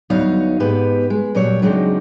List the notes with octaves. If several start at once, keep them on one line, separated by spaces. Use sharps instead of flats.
D2 F#3 B3 D#4 C#5 F5
G#2 B3 D#4 G4 B4
G#3
A#2 F#3 G4 C#5
C#3 F#3 G#3 C4 D4 D#4